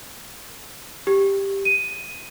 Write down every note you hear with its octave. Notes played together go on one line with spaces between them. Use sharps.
G4
D#7